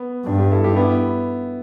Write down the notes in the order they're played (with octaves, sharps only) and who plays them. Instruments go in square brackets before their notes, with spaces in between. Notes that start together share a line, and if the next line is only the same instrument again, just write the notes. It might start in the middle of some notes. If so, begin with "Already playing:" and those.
Already playing: [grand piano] B3
[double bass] G2 [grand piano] D4
[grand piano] D4 G4
E4 A4
D4 G4
B3 E4